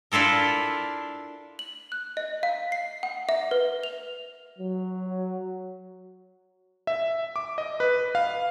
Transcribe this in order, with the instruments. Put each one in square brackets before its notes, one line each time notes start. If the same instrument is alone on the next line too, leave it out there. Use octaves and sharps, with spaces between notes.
[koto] D4 E4 F4 A4 A#4
[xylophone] F#7
F#6
D#5
F5
C7
F#5
E5
B4
F7
[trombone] F#3
[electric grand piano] E5
D6
D#5
B4
F5